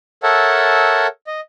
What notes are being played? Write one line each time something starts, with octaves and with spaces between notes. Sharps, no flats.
A4 A#4 C#5 E5 F#5 A5
D#5